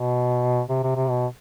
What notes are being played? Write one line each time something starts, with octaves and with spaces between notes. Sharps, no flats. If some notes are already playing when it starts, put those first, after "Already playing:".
Already playing: B2
C3
C3
C3
B2